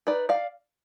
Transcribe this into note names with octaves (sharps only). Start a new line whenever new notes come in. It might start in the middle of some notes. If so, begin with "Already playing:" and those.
D#4 B4 D5
D5 F5